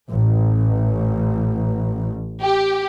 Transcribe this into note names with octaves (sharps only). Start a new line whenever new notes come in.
A1
G4